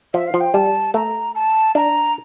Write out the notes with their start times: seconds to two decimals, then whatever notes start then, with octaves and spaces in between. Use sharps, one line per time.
0.13 F3 E5
0.27 F5
0.34 F3
0.40 G5
0.54 G3 A5
0.94 A3 A#5
1.35 A5
1.75 D4 A#5